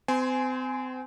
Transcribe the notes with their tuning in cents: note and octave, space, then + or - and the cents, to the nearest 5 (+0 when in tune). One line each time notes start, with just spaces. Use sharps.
C4 -35 G#5 +10 C6 +0